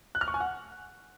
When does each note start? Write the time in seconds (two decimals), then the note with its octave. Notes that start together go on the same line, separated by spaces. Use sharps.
0.15 F#6
0.21 F6
0.28 C#6
0.34 G#5
0.40 F#5